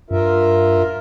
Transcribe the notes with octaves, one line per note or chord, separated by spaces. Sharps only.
G2 F4 A#4 E5